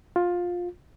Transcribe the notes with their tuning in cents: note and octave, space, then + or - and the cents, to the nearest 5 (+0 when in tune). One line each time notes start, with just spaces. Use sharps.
F4 +15